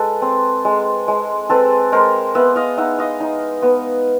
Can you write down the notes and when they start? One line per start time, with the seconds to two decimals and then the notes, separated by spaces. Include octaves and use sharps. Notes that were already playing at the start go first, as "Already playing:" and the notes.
Already playing: G#3 A4 B4
0.22 C4
0.65 G#3
1.08 G#3
1.50 C4 A4 B4
1.92 G#3 A#4 C5
2.35 B3 E5 F#5
2.56 D#5 F5
2.77 D#4 E5 F#5
2.99 D#5 F5
3.20 D#4
3.62 B3